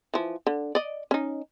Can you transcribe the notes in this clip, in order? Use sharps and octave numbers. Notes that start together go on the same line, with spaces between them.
E3 F3
D3
D5 D#5
C#4 D#4